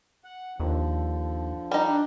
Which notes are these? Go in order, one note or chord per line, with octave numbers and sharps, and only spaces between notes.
F#5
D#2 D3 F3
G3 D#4
D4